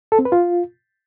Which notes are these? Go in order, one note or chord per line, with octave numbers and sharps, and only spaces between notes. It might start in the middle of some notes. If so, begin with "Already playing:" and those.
A4
C4
B4
F4